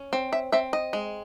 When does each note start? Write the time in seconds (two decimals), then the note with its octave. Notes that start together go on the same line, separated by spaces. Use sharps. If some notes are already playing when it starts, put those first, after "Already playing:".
Already playing: C#4
0.13 C4
0.33 E5
0.52 C4 E5
0.73 D#5
0.93 G#3